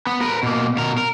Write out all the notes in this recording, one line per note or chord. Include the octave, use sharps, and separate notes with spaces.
B3
A#4 B4
B2 A#3
B2 A#4
A#4